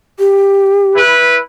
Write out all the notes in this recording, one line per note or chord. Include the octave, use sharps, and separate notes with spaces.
G4
E4 B4